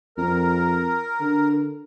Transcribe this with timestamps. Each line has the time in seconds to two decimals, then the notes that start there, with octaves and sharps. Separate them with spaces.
0.17 F2 A#4
1.21 D3